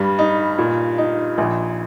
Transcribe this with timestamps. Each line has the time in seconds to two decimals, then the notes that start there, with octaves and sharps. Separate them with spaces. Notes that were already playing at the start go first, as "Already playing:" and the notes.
Already playing: G2 G3
0.19 D#4
0.58 A#2
0.98 D#4
1.38 A#1